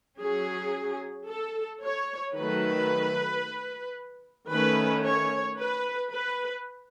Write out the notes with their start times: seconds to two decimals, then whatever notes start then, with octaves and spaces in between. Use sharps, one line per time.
0.20 F#3 C#4 G#4
1.28 A4
1.83 C#5
2.35 D#3 F#3 A3 B4
4.51 D#3 A3 C#4 B4
5.06 C#5
5.59 B4
6.12 B4